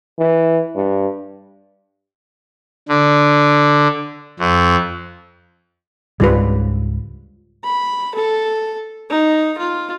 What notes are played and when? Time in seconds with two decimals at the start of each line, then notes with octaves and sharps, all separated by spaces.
0.19 E3
0.76 G2
2.89 D3
4.39 F2
6.20 C#2 G#2 C#3 G3 F4 B4
7.64 B5
8.15 A4
9.10 D#4
9.58 F4